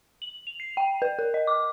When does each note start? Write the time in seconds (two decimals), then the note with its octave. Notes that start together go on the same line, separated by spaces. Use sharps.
0.22 F#7
0.47 F7
0.60 C7
0.77 G5
1.02 B4
1.19 A#4
1.34 D#5
1.47 D6